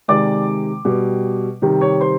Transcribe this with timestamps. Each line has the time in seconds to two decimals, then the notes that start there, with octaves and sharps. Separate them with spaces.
0.08 C3 D#3 G#3 D5 D6
0.85 B2 G3
1.62 C3 D#3 G3
1.81 C#5 C#6
2.01 C5 C6